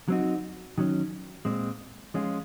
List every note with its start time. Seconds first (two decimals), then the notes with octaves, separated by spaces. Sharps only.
0.08 F#3 C4 D#4 F#4
0.78 D#3 F#3 C#4
1.45 A#2 G#3 C4
2.14 F3 G#3 C#4 F4